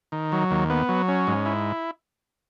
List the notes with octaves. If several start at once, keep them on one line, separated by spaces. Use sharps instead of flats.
D#3
F#3
D#2
B3
F#3
C#4
G#2
E4